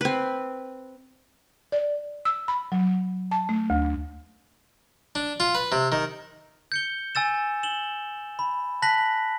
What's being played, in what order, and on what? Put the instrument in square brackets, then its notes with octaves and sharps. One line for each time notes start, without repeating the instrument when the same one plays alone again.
[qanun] C4 B4
[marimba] D5
E6
B5
F#3
A5
A3
D2
[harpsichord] D4
F4
B4
C3
D#3
[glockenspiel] G6 C#7 G7
G#5 E6 A6 E7
E7 F#7 G7
B5
A5 F#6 A#6 B6 F#7